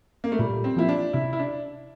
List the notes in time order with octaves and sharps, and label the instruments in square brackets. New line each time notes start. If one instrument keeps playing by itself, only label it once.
[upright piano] A#3
A3
[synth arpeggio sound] A#2 [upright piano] G3
[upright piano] C4
[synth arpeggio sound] F3 A#3 F4 [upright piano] E4
[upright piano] D4
[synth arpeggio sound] C3 [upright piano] E4
[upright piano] E4
D4